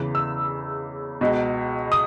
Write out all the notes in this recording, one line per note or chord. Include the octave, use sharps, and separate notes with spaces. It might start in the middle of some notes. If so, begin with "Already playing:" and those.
Already playing: E2 C#3 E3
E6
C#2 B2
D#6